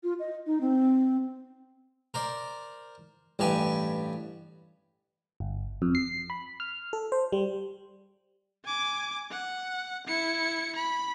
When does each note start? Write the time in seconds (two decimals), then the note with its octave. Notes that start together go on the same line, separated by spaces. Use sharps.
0.03 F4
0.19 D#5
0.46 D#4
0.61 C4
2.14 A#4 C5 D5
3.39 A1 G2 G4 B4 G#5 B5
5.40 G1
5.82 F2
5.95 C7
6.30 B5
6.60 F6
6.93 A4
7.12 C5
7.32 G3
8.64 G#5 D6
9.31 F#5
10.07 E4 C#7
10.76 B5